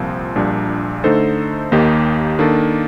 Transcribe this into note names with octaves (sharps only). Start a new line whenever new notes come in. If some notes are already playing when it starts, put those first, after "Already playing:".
Already playing: C2 A#2 F3 C4
A#1 A#2 G3 D4
D3 A3 D#4 A4 C5
D#2 D#3 A#3 D#4 G4
D#3 A#3 D4 A4